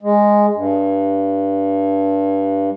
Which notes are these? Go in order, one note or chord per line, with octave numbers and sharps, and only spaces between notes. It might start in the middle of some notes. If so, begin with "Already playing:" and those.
G#3
G2